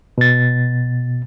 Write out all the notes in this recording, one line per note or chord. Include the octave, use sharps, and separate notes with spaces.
B2 A6